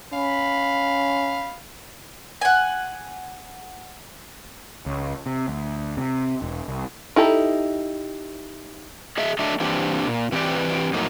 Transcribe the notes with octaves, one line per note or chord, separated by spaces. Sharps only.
C#4 F5 B5
F#5 G#5
C#2
C3
D2
C3
E1
C2
D#4 E4 G4 A4
G#4 D#5 E5
F#3 A3 D4 D#5 E5
E3 A#3 C4 D4 G4
A#2
E3 C4 G4 B4 D5
F2 A2 F#3 A#3 D#4